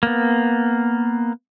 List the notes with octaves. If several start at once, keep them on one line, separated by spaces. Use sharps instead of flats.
A#3 B3